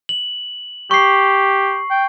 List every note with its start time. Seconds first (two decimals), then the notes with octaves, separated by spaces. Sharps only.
0.09 F#7
0.91 G4 C#6 C7
1.91 G5